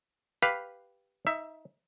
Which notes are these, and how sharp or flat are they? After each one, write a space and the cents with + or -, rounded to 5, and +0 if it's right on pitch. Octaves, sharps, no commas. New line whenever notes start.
G4 +0 B4 +0 F5 +0
D#4 +25 E5 +10